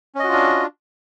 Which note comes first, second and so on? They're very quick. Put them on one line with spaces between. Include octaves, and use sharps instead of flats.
C#4 D#5 F#4 F4 D4